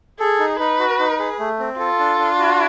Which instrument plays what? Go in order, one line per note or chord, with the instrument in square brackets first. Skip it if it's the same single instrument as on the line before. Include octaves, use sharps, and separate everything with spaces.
[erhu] G#4 [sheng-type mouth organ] A4
[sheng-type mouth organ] D#4
[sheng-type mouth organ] D#4 [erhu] B4
[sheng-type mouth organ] F#4
D#4
G#4
A3
C4
[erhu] F4 [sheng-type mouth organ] A4
[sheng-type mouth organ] D4
D4
F#4